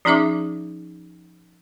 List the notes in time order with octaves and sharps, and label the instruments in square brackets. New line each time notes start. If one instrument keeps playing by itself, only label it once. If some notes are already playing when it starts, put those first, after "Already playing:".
[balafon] F3 C#4 D#4 G#4 E5 D6